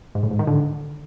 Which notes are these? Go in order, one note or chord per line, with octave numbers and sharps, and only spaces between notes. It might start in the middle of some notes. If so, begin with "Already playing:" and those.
G#2
A2
G#2
D#3
D3